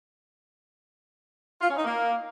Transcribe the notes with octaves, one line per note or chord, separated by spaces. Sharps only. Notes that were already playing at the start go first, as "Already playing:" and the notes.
F4
C#4
D#4
A#3